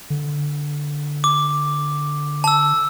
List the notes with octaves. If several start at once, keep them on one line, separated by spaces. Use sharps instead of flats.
D3
D6
A5 E6